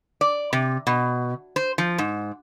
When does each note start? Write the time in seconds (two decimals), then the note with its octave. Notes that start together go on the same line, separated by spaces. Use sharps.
0.21 D5
0.53 C3
0.87 B2
1.56 C5
1.78 F3
1.98 G#2